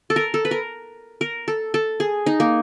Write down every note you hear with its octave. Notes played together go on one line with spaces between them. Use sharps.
A4
A#4
A4
B4
A#4
A#4
A4
A4
G#4
D#4
A#3